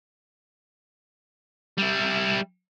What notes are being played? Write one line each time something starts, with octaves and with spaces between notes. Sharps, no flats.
G3 E4